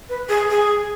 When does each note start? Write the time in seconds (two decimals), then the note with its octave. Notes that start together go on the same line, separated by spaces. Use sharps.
0.09 B4
0.29 G#4
0.50 G#4